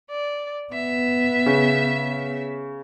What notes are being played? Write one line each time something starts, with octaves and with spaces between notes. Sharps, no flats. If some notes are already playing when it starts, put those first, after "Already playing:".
D5
B3 E5
C#3